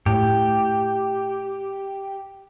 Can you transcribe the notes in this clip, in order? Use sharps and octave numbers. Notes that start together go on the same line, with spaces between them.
A2 G4